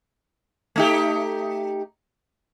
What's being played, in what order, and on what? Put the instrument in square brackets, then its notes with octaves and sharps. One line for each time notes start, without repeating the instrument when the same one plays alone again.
[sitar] A3 D#4 G4